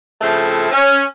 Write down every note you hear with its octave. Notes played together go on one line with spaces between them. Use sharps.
C#3 F3 A3 C4 E4 A4
C#4